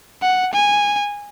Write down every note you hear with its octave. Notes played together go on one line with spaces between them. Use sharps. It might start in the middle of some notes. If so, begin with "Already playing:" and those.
F#5
G#5